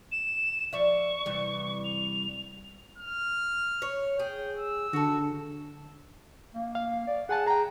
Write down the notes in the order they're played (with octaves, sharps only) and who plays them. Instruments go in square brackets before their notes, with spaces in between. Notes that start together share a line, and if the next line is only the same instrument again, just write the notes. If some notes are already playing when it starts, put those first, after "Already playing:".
[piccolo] E7
[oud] F3 D5 E5 [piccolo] C#6
[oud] C3 E3 G3
[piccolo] F7
[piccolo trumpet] F6
[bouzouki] C#5
[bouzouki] G#4 [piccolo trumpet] G5
[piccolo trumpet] E6
[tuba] D3 [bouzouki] F#4 A4
[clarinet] A#3
[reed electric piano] F5
[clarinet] D5
[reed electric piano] G#4 G#5 A5 [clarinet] F#5
[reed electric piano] G#4 G5 [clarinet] A#5